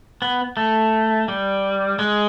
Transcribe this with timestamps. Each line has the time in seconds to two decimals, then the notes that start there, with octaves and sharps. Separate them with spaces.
0.22 B3
0.57 A3
1.28 G3
1.99 G#3